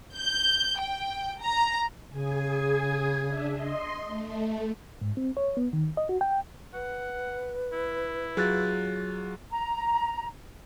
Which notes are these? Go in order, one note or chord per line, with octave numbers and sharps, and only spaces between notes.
G6
G5
A#5
C#3 G#4 G#5
D4 E5
D#5 C6
A3
G#2
C4
C#5
B3
D#3
D#5
F#4
G5
B4 F#5
E4
F#3 F4 G#4 F#6 A6
A#5